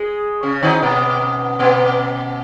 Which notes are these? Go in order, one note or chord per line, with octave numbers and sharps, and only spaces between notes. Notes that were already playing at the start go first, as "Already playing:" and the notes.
Already playing: G#3 G#4
C#3 C#4
D#3 D#4
B2 B3
B2 B3